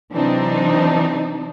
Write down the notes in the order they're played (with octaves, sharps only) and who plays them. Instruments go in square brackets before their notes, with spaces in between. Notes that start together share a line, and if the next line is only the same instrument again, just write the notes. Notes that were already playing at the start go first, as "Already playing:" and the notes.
[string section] C3 E3 F#3 C4 D4 D#4